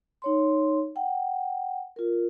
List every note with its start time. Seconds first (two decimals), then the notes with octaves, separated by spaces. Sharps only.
0.22 D#4 C#5 C6
0.96 F#5 G5
1.96 F4 A#4